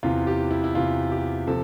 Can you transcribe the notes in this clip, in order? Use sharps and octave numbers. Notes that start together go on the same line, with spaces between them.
E2 C3 E3 F4
G4
E4
E4
E2 C3 E3 F4
G4
C3 F3 A4